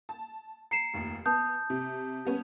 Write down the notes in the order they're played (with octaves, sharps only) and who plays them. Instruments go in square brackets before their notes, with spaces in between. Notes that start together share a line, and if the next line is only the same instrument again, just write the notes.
[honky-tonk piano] A5
[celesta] A#5 C7 E7 [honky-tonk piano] C#7
[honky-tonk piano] F1 D#2
[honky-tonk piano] B3 [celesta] A5 D#6 G6
[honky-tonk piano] C3
G3 B3 C#4